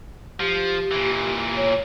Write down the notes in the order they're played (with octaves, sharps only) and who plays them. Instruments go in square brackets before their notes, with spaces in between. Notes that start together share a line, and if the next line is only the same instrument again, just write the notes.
[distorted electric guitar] F3 [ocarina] G4
[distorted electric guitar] A#2 E3
[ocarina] C#5